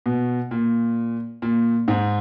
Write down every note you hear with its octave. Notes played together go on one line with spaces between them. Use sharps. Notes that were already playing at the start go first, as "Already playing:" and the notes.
B2
A#2
A#2
G#2